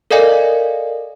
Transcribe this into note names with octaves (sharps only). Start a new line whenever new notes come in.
A4 A#4 D5 D#5 F5 G#5